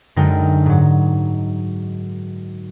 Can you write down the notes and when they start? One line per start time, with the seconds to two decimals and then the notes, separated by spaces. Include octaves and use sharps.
0.16 F#2 D3 G#3 D#4 A#4 G5
0.66 G#2 F#3